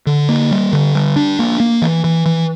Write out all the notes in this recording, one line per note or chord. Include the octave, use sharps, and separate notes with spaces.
D3
A#3
G3
D3
G3
D4
A#3
A#3
E3
E3
E3